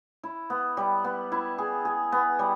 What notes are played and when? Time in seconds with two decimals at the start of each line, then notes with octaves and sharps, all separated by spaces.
0.23 E4
0.50 B3
0.77 G3
1.04 B3
1.32 E4
1.58 G#4
1.85 G#4
2.12 B3
2.39 G3